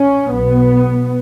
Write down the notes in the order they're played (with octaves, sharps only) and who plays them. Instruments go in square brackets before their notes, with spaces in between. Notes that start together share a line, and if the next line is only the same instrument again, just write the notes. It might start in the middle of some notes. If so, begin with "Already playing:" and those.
Already playing: [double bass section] C#4
B1 B2 B3